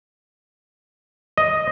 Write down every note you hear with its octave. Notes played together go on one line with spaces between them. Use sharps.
D#5